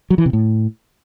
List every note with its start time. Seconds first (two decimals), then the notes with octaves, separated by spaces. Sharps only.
0.10 F#3
0.18 E3
0.26 C3
0.33 A2